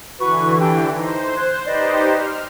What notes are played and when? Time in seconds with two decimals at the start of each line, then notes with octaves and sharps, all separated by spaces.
0.20 D3 E3 F#4 B4 C#6
0.59 D4 G4 G5
0.97 D#4 C5
1.36 F#6 G#6
1.66 D#4 G4 B4 C5 D5 D#5
2.16 F6